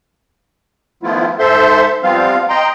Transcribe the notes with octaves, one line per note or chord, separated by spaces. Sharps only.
D#3 F3 A3 B3 E4 F4
G#2 A4 C5 E5 C6
F3 G3 B3 C4 F4 F5
D#5 G5 A#5 C6